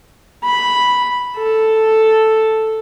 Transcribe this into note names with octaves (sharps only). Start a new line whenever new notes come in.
B5
A4